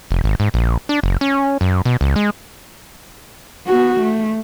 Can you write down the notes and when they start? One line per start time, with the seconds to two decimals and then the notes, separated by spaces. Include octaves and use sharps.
0.11 F1
0.24 G#1
0.40 G#2
0.54 A#1
0.89 D4
1.03 F#1
1.21 C#4
1.61 F#2
1.85 B2
2.01 C#2
2.16 G#3
3.67 B3 F#4
4.00 A3